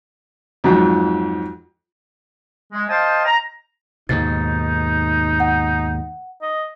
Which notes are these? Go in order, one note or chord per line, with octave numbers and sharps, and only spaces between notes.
F2 G#2 F3 F#3
G#3
C5 D#5 F5 G5 A5
A#5
D#2 G#2 B2 D#4 A6
F#5
D#5